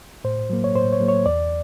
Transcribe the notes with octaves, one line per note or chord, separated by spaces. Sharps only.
A2 C5
F#3 A#3
C#5
A2 C5
C#5
F#3 A#3
C#5
E2 D5